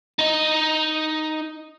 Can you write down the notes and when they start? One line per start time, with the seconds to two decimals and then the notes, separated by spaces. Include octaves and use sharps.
0.19 D#4 D#5